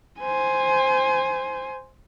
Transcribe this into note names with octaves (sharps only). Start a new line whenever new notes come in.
C5 G#5